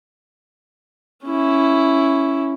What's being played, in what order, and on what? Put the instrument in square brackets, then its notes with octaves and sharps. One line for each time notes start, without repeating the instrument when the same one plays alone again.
[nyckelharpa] C#4 E4